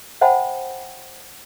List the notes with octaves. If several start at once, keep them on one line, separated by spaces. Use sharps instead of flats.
C5 E5 F#5 G5 A5 B5